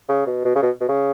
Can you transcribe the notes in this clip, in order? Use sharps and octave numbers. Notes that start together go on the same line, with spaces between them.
C#3
B2
B2
C#3
B2
B2
C#3